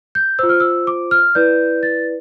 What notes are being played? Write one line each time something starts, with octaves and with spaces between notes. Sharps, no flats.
G6
F4 C5 E6
F6
E6
D6
F6
E4 B4 D5 G6
A6